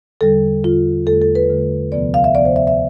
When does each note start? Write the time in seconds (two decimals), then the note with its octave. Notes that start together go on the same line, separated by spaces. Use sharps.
0.21 E2 D3 G3 A4
0.64 E2 D3 G3 F4
1.06 E2 D3 A3 A4
1.22 A4
1.35 B4
1.50 E2 D3 A3
1.92 D2 C3 F3 B3 D5
2.14 F5
2.24 E5
2.35 D2 C3 F3 B3 D5
2.45 C5
2.56 E5
2.67 E5